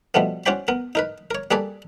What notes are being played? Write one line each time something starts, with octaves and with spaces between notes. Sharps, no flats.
B2 F3 G3 A3 B3
C#4 F#4 C5 D5 G5 B5
B3 A#4
D#4 A#4 B4
A#4 C#5
G3 A#3 G#4 A4 B4 D5